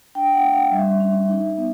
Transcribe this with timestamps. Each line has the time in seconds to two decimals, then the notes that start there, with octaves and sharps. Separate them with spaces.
0.15 D4 G5
0.34 F#5
0.43 A3
0.53 F5
0.71 G3 E5
1.00 C#4
1.29 D#4
1.57 B3